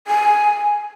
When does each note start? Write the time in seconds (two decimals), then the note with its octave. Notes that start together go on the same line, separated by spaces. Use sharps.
0.07 G#5